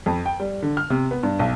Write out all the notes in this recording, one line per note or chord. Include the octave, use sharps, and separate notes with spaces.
F2
G5
G3
D3
F6
C3
B3
G2
B1